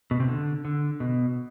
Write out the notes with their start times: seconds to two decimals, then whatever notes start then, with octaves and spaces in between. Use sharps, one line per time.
0.11 B2
0.20 C3
0.28 D3
0.65 D3
1.00 B2